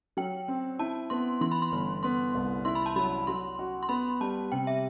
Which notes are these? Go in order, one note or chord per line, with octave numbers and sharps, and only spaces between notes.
F#3 G5
C4
E4 A5
B3 C6
E3 C6
B5
C6
G1
B3 C6
C2
E4 C6
B5
A5
F#3 B5
F#3 C6
F#4
C6
B3 B5
G3 A5
C3 G5
E5